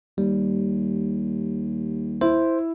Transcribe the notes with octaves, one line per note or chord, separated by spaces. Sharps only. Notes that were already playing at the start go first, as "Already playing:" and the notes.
D#2 G3
E4 C5